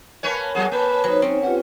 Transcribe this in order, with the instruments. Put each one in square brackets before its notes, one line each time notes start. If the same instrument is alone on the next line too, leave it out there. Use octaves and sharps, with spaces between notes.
[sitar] A#3 B4 C#5 [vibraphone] G#5 A5
[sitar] F#3 B3 G#4 [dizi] F#5
[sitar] A#3 [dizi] B4 [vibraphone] C#5 G#5 A5
[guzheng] F#3 [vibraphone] D#4 C5
[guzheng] C4 C#4
[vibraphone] F4 G4 B4 [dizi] F#5